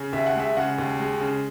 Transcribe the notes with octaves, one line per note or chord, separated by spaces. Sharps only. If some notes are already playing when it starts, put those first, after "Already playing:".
Already playing: C#3
D#2 E5
F#5
G#3 E5
C#3 F#5
D#2
G#3
C#3